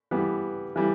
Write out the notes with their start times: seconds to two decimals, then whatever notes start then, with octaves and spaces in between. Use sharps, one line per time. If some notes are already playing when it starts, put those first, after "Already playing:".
0.11 E3 G3 B3
0.76 E3 G3